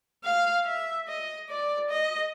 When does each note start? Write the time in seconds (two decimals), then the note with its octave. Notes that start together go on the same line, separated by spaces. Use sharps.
0.24 F5
0.66 E5
1.08 D#5
1.49 D5
1.90 D#5